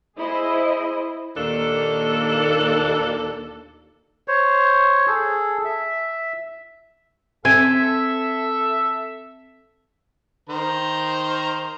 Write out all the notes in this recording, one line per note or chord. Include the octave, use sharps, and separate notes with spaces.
E4 G#4 C5 D#5
D#2 A#2 D#3 A#3 D4 A4
C5 C#5
G#4 A4
E5
C4 A4 E5 G#5
D#3 C5 A#5